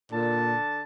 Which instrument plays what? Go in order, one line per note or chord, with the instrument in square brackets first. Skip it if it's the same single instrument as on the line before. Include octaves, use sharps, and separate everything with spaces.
[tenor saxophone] A#2 [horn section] D3 A5